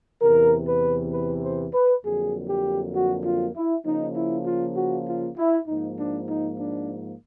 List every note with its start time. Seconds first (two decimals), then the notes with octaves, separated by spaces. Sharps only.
0.22 E2 C3 E3 A#4
0.68 B4
1.13 B4
1.43 C5
1.73 B4
2.04 F2 D3 F#3 A#3 G#4
2.49 G4
2.95 F#4
3.25 F4
3.55 E4
3.85 C#3 F3 A#3 D#4
4.16 E4
4.47 F4
4.76 F#4
5.08 F4
5.37 E4
5.68 G#2 F3 A#3 D#4
5.99 D4
6.29 D#4
6.60 D4